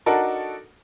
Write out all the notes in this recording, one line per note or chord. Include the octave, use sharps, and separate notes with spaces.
D4 D#4 F#4 A4 A#4